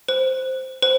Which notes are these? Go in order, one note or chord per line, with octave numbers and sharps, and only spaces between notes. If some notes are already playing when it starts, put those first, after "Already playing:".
C5
C5